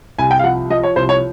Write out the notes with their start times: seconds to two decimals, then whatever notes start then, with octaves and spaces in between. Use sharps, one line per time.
0.19 C2 G#5
0.31 G5
0.39 F5
0.44 F3 F#5
0.70 F3 D#5
0.83 C#5
0.96 C2 C5
1.09 C#5